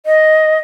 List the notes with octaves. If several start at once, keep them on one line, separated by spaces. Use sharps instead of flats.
D#5